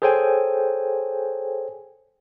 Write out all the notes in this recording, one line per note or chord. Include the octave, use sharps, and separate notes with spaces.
G#4 A4 C5 C#5 G5 G#5